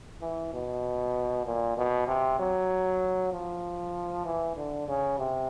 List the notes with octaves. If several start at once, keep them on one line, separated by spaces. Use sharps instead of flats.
E3
B2
A#2
B2
C3
F#3
F3
E3
D3
C#3
C3